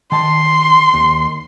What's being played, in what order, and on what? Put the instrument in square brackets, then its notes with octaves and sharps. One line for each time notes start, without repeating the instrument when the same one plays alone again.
[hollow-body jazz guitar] D#3 A5 [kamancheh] C6
[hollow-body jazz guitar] D#2